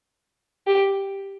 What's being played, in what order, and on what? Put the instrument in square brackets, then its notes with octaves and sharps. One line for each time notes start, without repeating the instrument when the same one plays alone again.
[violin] G4